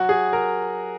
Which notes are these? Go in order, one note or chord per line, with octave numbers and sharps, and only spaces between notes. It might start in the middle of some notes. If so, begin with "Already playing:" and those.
Already playing: F#3 F#4
G#4
A#4